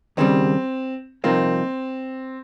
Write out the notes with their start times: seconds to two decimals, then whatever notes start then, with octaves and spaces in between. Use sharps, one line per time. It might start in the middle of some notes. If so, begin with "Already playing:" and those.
0.17 D#2 C#3 G3 C4
1.24 C2 C3 F3 A#3 C4 D#4